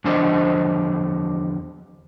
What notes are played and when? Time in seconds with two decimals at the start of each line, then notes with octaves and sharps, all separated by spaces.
0.04 E2 D3 F3 D4 C5 D#5